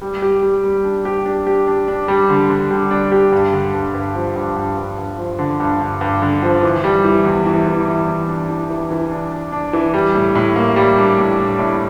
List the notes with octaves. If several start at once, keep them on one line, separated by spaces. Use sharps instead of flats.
G3
G4
G3
G3
D4
G4
D4
G4
D4
D4
G3
D3
D3
G3
D4
G4
G2
D3
G2
G2
F3
G2
G2
G2
G2
F3
D3
G2
G2
G2
D3
F3
E3
G3
E3
E2
E3
E3
E3
E2
D4
E3
E3
E3
D4
D4
D4
E3
G3
A2
A2
A#3
G3
D4
A2
D4
A2